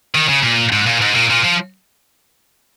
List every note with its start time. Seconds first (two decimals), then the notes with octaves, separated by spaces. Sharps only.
0.15 D#3
0.29 C#3
0.43 A#2
0.72 G#2
0.87 A#2
1.01 G#2
1.15 A#2
1.30 A#2
1.44 F3